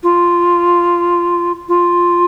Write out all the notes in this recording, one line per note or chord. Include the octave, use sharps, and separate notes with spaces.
F4
F4